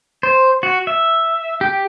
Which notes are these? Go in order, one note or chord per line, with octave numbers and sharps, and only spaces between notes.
C5
F#4
E5
G4